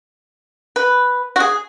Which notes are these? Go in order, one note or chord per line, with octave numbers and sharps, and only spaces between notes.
B4
F#4
G#4